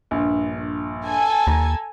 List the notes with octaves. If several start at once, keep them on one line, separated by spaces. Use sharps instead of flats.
A#1 G2
A4 G#5
D#2 A#5